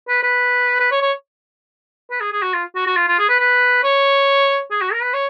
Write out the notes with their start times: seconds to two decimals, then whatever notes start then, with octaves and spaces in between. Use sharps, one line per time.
0.09 B4
0.23 B4
0.80 B4
0.92 C#5
1.02 C#5
2.11 B4
2.21 G#4
2.32 G#4
2.42 F#4
2.54 F4
2.75 F#4
2.87 F#4
2.96 F4
3.08 F4
3.19 G#4
3.29 B4
3.40 B4
3.84 C#5
4.71 G#4
4.81 F#4
4.93 A#4
5.03 B4
5.14 C#5